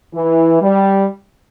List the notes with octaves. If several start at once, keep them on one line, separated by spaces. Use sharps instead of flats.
E3
G3